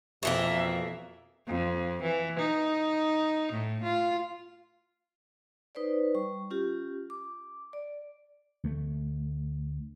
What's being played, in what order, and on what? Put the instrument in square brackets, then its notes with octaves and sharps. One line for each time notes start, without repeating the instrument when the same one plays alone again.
[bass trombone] F2 [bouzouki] B2 E3 A#3 [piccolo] E5
[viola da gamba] F2
E3
D#4
A2
F4
[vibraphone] D#4 B4 C5 D5
G3 C#6
C#4 F4 G4
D6
D5
[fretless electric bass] D2 A3